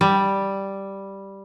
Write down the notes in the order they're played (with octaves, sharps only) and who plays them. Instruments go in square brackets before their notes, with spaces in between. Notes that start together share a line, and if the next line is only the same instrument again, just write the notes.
[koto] G3